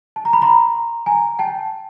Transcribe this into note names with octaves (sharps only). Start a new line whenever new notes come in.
A5
A#5
B5
A#5 C6
G#5 A#5
G5 A5